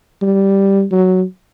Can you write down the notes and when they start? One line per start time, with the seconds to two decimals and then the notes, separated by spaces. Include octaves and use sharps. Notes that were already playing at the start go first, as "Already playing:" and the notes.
0.22 G3
0.92 F#3